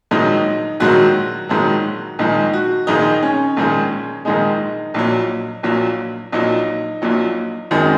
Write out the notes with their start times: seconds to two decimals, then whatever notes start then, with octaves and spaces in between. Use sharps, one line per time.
0.11 A#1 G#2 D#3 F#3 D#4
0.80 A#1 G#2 D#3 F#3 F#4
1.49 A#1 G#2 D#3 F#3
2.19 A#1 G#2 D#3 G#3 D#4
2.54 F#4
2.87 A#1 G#2 D#3 G#3 D#4
3.23 C#4
3.57 A#1 G#2 D#3 G#3
4.25 A#1 G#2 D#3 G#3 D#4
4.94 A#1 A#2 F#3
5.63 A#1 A#2 F#3
6.32 A#1 A#2 F#3 D#4
7.02 A#1 A#2 F#3
7.71 G#1 F#2 D#3 G#3